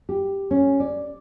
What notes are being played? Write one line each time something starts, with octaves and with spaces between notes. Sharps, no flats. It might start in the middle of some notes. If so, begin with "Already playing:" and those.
G4
C#4
D5